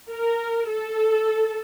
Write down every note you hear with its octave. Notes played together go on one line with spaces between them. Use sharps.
A#4
A4